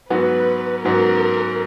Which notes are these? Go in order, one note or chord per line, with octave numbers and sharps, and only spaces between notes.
G#2 F#3 B3 F#4 B4
G#2 F#3 B3 F#4 A#4